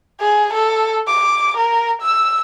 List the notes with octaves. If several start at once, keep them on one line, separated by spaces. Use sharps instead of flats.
G#4
A4
D6
A#4
E6